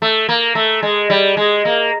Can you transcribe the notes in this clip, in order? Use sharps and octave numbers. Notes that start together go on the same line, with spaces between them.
A3
A#3
A3
G#3
G3
G#3
A#3